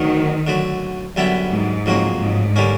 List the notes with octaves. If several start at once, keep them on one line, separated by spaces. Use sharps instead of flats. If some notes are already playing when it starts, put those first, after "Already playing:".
Already playing: D2 D3 D#3 F#3
D3 F#3 A3
F#2 D3 G3 B3 E4
G#2
F2 C#3 F#3 A#3
G#2
D3 G3 A#3 C#4